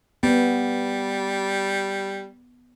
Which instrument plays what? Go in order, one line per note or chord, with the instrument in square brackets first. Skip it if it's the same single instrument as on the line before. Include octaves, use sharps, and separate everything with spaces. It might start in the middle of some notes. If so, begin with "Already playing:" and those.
[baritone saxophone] G3 [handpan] B3